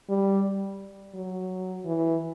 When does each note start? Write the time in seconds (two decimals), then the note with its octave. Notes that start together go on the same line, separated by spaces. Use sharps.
0.09 G3
1.15 F#3
1.85 E3